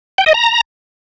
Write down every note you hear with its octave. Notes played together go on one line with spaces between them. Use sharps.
G5
D#5
A#5